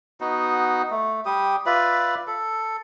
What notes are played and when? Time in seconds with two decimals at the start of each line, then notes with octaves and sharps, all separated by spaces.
0.21 B3 D#4 F#4
0.91 A3
1.25 G3 G4 D#6
1.66 F4 B4 D5 E5
2.27 A4